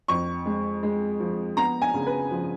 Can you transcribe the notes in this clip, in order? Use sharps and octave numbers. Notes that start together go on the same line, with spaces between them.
F2 C#6
G#3
G#3
F3
B3 A#5
G#5
C#3
B4
F3